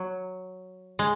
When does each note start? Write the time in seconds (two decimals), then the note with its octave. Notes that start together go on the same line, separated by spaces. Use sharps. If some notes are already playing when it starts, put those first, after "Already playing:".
Already playing: F#3
0.99 G#3